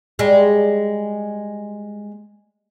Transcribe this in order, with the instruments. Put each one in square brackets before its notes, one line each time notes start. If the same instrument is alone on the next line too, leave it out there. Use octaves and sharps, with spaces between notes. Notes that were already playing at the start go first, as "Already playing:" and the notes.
[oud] G3 G#3